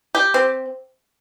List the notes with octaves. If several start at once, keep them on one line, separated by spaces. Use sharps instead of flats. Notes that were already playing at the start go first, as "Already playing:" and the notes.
G4
C4